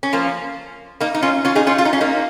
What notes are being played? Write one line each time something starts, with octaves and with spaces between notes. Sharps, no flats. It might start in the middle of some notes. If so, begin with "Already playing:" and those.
C#4
F3 A#3
A#3 D#4
D#4
C#4 F4
C#4 F4
D#4 G#4
C#4 F4
F4
D#4
C#4
A#3 D#4